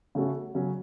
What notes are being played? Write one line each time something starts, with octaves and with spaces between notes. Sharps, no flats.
C#3 A3 C#4 F#4 A4
C#3 F#3 C#4 F#4